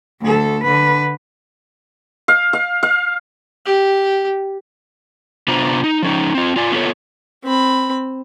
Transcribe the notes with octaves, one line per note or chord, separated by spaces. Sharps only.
D2 A4
D3 B4
F5
F5
F5
G4
C3 B3 D4 F4 C5 A#5
D#4
F3 C#4 D#4
C4 F4
F4 D5 G#5
B3 C#4 F4 G4 A4 C#5
C4 B5